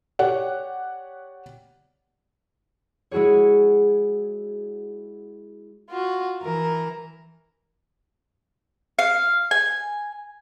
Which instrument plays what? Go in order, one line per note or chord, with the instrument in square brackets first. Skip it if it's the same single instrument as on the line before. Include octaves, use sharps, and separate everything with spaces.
[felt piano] G4 C#5 D5 F#5
[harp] G#3 E4 F#4 G#4 C#5
[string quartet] F4 F#4
E3 A#4
[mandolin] F5
G#5